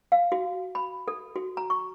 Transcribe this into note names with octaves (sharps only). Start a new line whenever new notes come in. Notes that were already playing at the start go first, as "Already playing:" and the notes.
F5
F#4
B5
A4
F#4
A#5
C#6